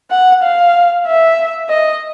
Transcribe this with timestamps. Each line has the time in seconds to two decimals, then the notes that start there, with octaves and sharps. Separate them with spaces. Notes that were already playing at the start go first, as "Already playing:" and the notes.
0.10 F#5
0.43 F5
1.06 E5
1.69 D#5